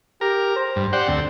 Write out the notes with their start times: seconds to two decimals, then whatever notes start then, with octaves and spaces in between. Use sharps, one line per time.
0.21 G4 A#4
0.56 C5
0.76 G2
0.93 G4 C5 D5 F#5
1.08 D2 C4